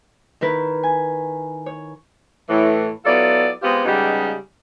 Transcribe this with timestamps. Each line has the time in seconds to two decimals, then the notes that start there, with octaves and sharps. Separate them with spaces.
0.41 D#3 E4 A#4 B4
0.83 G#5
1.66 C#5
2.49 A2 E3
3.05 F#3 B3 E4 F4 A4 D5
3.63 G#3 B3 C4 F4 G4
3.85 C#3 G3 G#3 B3 D#4 G4